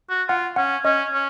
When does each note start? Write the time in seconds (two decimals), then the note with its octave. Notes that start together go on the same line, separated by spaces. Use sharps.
0.10 F#4
0.28 F4 F#5
0.56 C#4 F#5
0.85 C#4 D#5
1.13 C#4